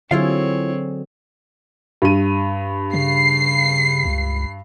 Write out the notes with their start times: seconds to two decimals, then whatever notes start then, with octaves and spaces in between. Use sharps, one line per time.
0.11 D3 F#3 C4 E4 F4 G#4 C#5 F5
2.02 G2 D#7
2.93 C#3 C7
4.05 C#2